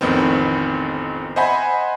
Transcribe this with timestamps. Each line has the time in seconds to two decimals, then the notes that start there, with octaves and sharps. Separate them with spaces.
0.01 A1 F2 D#3 B3 C4
1.36 C5 D#5 E5 F#5 G#5 B5